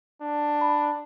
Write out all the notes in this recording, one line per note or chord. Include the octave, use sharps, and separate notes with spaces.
D4
B5